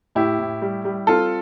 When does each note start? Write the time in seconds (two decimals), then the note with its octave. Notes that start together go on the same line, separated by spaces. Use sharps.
0.15 A2 E4 G4
0.39 A2
0.62 G3
0.85 G3
1.07 C4 F4 A4